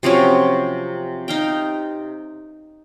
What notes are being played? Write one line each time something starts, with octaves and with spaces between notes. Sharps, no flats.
C3 F3 F#3 C#4
D#4 F5 G5